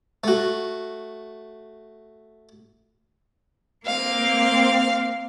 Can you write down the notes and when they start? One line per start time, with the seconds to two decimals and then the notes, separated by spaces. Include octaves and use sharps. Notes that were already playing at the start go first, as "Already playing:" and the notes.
0.24 A3 F#4
3.86 A#3 C4 F5